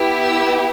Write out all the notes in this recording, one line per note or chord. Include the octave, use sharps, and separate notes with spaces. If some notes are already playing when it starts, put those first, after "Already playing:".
Already playing: B3 E4 G4
E6